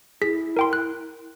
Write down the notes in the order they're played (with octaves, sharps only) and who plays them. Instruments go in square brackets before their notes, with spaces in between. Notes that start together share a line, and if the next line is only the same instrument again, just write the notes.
[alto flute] E4 [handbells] G#4 B6
[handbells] A#4 G5 C6
F#6